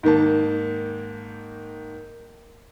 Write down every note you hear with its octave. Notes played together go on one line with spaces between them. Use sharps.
G#2 D#3 A#3 A5